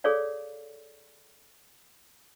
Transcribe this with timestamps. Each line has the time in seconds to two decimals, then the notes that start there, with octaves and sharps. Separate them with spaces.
0.04 G#4 A4 C#5 D5 F5